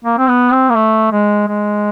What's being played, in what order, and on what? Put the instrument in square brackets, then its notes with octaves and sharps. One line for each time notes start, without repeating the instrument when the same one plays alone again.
[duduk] A#3
C4
B3
C4
A#3
A3
G#3
G#3